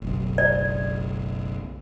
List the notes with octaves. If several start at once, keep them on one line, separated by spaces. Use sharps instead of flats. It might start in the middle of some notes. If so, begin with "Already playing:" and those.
F#1 B1
D5